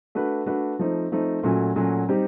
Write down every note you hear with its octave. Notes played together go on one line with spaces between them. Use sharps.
A3 D4 F#4 B4
A3 D4 F#4 B4
F3 A3 C4 D#4
F3 A3 C4 D#4
A#2 F#3 A3 C#4 F#4
A#2 F#3 A3 C#4 F#4
G3 C4 D#4 G4